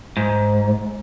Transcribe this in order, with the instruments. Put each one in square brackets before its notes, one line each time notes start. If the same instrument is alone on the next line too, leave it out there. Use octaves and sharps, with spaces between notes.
[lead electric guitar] G#2